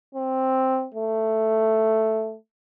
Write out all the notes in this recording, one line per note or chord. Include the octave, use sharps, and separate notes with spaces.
C4
A3